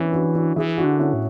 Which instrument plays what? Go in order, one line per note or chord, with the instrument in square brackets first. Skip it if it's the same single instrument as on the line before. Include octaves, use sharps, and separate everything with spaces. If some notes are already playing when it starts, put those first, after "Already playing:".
Already playing: [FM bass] E3 [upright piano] B3 C#4 D4 E4
[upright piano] D4 F#4
D4 F#4
[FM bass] E3 [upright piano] E4 G#4
[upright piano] D4 F#4
[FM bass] D3
[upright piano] C#4 E4
[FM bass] A2